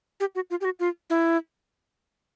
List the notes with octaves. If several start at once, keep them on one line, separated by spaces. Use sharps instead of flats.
G4
F#4
F4
G4
F#4
F4
E4